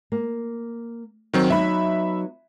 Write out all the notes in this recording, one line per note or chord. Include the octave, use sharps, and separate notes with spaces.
A#3
D#3 F#3 C4
F#3 B3 D#4 E5 B5